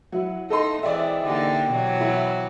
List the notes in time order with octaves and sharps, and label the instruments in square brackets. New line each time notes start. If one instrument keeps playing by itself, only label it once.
[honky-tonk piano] F#3 [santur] E4 F#5
[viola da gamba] D#4 [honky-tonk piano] A4 D#5 C6
[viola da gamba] E3 [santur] G#3 C4 G#4 [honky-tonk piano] D5 E5
[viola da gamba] D3 A#3 D#4 [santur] G4 G5
[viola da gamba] B2 E3 F#3
[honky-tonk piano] E4